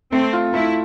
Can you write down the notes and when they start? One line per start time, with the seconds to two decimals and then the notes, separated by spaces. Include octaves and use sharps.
0.12 A3 C4
0.33 F4
0.54 A3 E4